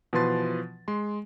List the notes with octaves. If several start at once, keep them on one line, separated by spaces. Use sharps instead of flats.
B2 E3 F3 B4 C6 A6
G#3 C6